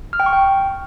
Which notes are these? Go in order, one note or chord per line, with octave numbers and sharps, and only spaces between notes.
F6
G5
C#6
G5